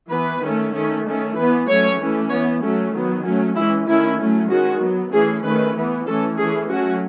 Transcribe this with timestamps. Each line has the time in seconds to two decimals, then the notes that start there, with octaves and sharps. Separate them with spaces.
0.11 E3 B3 B4
0.42 D#3 A3 C#4
0.73 D#3 A3 C#4
1.06 D#3 A3 C#4
1.36 E3 B3 B4
1.68 F#3 A3 C#4 C#5
2.00 E3 A3 C#4
2.30 E3 B3 C#5
2.61 F#3 A3 C#4
2.93 D#3 F#3 B3
3.24 F#3 A3 C#4
3.55 E3 G#3 C#4 E4
3.87 D#3 A3 C#4 E4
4.19 F#3 A3 C#4
4.49 D#3 G#3 C#4 F#4
4.81 F#3 B3
5.12 E3 A3 C#4 G#4
5.43 D#3 A3 C#4 B4
5.74 E3 B3
6.06 E3 A3 C#4 A4
6.37 E3 A3 C#4 G#4
6.69 F#3 A3 C#4 F#4